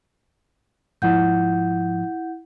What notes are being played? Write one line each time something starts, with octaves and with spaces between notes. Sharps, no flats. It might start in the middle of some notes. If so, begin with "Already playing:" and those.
G#2 F3 E4 F#5 G6